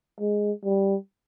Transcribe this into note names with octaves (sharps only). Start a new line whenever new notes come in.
G#3
G3